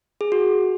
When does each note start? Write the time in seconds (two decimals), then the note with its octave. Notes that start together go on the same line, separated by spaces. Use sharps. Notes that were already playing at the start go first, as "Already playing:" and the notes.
0.21 G#4
0.32 F#4